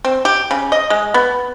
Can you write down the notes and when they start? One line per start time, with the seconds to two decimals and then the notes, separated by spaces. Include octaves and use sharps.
0.05 C4
0.25 G4
0.51 C#3
0.72 D#5
0.90 G#3
1.14 B3